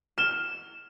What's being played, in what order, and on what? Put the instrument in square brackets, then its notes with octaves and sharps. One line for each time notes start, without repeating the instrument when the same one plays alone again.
[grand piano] F6 G7 [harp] E7